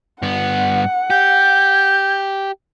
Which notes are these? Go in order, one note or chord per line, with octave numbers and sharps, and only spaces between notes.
G2 B3 F#5
G4 G6